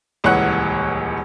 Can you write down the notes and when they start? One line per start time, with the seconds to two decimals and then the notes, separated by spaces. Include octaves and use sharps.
0.24 D#1 C#2 E3 C#5 F#5 F#6